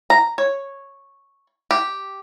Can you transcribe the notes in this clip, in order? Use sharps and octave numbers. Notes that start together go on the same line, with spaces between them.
A#5
C#5
G4